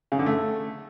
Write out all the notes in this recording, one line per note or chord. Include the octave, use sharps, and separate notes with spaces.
C#3
D3
A3